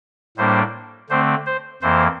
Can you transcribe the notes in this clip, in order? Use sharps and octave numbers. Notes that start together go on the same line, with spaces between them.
A2 G3 A#3 D4 C5
D3 A3 C4 C5
C5
F2 E3 A#3 C5